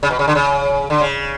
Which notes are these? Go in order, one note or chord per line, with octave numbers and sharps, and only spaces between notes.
C#3
B2
C#3
D3
C#3
D3
C#3